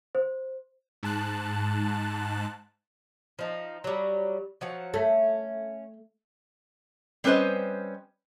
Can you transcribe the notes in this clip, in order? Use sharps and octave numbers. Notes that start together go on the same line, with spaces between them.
C5
G#2 A5 F#6
F3 D#4
F#3 G3
F3 F#3 F#5
A3 C#4
G3 C4 C#4 B4 C5 D#5